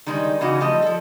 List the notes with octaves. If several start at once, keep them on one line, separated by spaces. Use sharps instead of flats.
D#3 G3 G#3 D#4
C#3 E3 D#4 F#4
F3 G3 A3 D#5
F3 A4